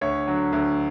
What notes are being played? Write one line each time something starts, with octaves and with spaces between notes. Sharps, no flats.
D2 C#5
D3 F#3
D2